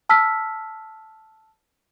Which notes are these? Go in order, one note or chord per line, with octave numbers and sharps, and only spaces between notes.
A5 E6 F6 B6